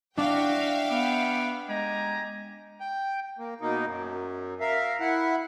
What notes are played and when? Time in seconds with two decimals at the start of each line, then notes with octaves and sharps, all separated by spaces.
0.18 D4 F#4 E5 F5 G5
0.91 B3 G4 F#5 D6
1.69 G#3 G4 G#5 A#5
2.80 G5
3.39 A#3
3.61 B2 A#3 D#4
3.86 F#2
4.60 A#4 E5 F5
5.00 E4 F#5